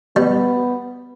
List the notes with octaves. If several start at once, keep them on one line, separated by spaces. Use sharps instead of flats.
G3 B3